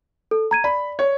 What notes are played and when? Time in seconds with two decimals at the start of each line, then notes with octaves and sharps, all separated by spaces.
0.31 A4
0.51 A#5 G#6 D#7
0.64 D5 B5
0.99 C#5